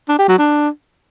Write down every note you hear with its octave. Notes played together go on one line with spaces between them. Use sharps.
D4
G4
F#3
D4